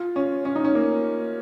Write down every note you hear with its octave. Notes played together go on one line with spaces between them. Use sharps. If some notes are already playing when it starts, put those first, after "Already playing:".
Already playing: F4
C#4
C#4
D#4
C#4
A#3